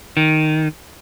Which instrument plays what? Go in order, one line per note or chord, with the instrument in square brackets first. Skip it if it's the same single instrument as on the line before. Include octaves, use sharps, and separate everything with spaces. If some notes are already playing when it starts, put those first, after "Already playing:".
[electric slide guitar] D#3